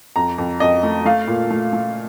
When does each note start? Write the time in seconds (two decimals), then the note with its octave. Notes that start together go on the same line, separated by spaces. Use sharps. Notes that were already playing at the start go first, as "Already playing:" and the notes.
0.16 F2 A#5
0.38 F2
0.60 F2 D#5
0.83 A3
1.05 A3 F5
1.27 A#2
1.50 A3
1.73 A3